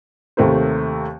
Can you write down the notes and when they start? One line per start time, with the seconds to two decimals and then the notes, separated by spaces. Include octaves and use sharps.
0.37 D#2 C3 A3 A#4 C5